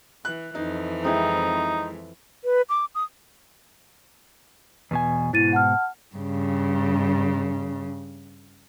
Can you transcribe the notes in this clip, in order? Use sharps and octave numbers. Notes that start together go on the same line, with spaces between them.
E3 F#6
F2 E3 D#4
G#3 C4 D#4 E4
B4
D6
D#6
E2 B2 G#5
G#2 B2 E4 A6 D#7
F#5 A5 F6
G2 C#3